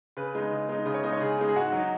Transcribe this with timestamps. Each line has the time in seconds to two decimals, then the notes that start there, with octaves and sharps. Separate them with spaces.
0.17 C#3 B4
0.35 G#3 D#4
0.51 C#3
0.69 G#3 D#4
0.86 C#3 D#5
0.94 C#5
1.03 G#3 D#4 D#5
1.13 C#5
1.21 C#3 G#4
1.38 G#3 D#4
1.49 G#4
1.55 G#2 F#4
1.72 F#3 D#4